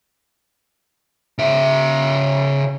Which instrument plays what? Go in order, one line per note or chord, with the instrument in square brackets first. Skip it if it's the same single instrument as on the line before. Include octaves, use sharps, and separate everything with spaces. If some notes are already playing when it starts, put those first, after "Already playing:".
[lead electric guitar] C#3 E5